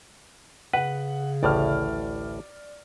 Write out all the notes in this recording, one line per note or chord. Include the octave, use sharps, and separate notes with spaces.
C#3 B4 F#5
A1 D2 A2 D5 F6